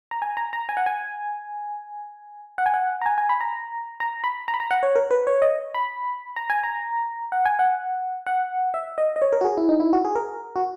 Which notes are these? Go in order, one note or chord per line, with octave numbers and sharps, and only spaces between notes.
A#5
G#5
A#5
A#5
G#5
F#5
G#5
F#5
G#5
F#5
A#5
G#5
G#5
B5
A#5
A#5
B5
A#5
B5
A#5
F#5
C#5
A#4
B4
C#5
D#5
B5
A#5
G#5
A#5
F#5
G#5
F#5
F#5
E5
D#5
D#5
C#5
A#4
F#4
G#4
E4
D#4
E4
F#4
G#4
A#4
F#4